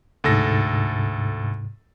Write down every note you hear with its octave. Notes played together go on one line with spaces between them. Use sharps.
D2 G#2 C3 A4 A#6